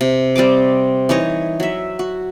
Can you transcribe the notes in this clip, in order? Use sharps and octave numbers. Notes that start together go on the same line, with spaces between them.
C3
G3 C4 D#5 D6
E3 D#4 C#5 D#5
F#3 E5
F#4